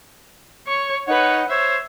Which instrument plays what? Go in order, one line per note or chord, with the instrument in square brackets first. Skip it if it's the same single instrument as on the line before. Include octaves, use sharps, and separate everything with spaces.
[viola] C#5 C#6
[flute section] D#4 F#5 [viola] B4 C#5
[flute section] C5 C#5 [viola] E5